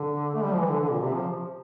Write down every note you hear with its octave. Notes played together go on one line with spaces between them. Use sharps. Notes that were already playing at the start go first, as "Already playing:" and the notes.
Already playing: D3
A3
G3
F3
E3
D3
D3
A#2
C3
F3